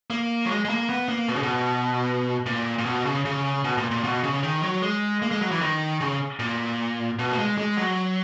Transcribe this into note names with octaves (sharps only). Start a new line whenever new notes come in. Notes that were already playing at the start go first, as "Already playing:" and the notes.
A#3
F#3
G#3
G#3
A#3
B3
A#3
B2
C#3
B2
A#2
A#2
B2
C#3
C#3
B2
A#2
A#2
B2
C#3
D#3
F#3
G#3
A#3
G#3
F#3
E3
D#3
C#3
A#2
B2
A#3
G#3
G#3
F#3